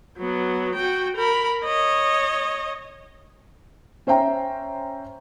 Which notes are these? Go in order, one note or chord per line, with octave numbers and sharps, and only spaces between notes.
F#3 B3
F#4 G5
A#4 B5
C#5 D#5
C#4 C5 E5 G5 A#5